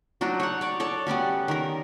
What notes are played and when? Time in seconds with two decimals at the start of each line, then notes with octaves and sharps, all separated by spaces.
0.21 F#3 D4 D#4 F#4
0.40 C#5 F#5
0.61 C#5 D5
0.80 A4 C#5 D5
1.07 G3 B3 C#4 F#4
1.48 D#3 A#4